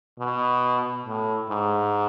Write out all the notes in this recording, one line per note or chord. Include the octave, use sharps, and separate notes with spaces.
B2
A2
G#2